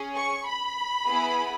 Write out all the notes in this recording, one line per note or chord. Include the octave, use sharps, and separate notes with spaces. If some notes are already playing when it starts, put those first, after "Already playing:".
Already playing: C#4 G#4
C#6
B5
B3 E4 G#4